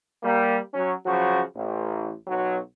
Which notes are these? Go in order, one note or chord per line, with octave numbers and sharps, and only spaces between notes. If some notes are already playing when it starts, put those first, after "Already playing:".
G3 A#3
F#3 C#4
C#3 F3 F#3 F#4
A1
B1 F#3